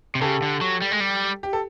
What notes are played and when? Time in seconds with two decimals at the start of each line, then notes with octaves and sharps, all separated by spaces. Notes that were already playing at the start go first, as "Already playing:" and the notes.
0.15 C3
0.21 C#3 G4 A4
0.42 D3
0.61 F#3
0.82 G3
0.92 G#3
1.00 G3
1.43 G4
1.53 A4